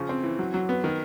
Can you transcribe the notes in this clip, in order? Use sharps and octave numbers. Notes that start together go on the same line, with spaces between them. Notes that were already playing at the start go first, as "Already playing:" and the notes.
Already playing: C#3 F3
C4
E3
F#3
F#3
B3
D#3